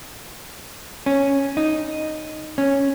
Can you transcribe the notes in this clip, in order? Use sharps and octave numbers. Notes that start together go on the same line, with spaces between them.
C#4
D#4
C#4